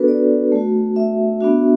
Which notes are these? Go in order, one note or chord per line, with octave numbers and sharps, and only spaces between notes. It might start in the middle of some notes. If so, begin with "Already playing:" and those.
Already playing: B3 D4 F#4 A4 B4
D5
A3 F#4
E5
B3 D4 F#4